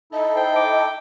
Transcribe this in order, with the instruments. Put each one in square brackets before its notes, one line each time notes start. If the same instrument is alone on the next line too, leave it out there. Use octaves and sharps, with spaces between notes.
[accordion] D#4 E4 A4 [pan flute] D#5
[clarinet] C5 [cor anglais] G5
[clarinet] D6